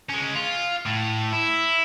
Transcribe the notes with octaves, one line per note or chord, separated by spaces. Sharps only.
G#3 C#4
F4
A2
E4